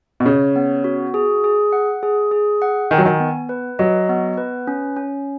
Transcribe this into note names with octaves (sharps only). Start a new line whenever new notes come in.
B2
C#3 C#5
B3
F#4
G#4
G#4
F#5
G#4
G#4
F#5
D#3 G#5
F#3
D#3
B3
B4
F#3 D#5
B3
B4
C#4
C#4